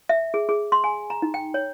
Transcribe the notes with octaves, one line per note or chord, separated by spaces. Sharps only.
E5
G#4
G#4
C6
G#5
A#5
D#4
G5
C#5